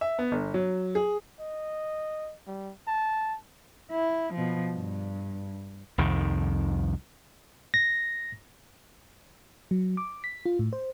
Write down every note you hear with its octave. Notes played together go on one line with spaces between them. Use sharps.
E5
B3
G1
F#3
G#4
D#5
G3
A5
E4
B2 F3
G2
C2 F2 D#3
A#6
F#3
D6
B6
F4
A2
C5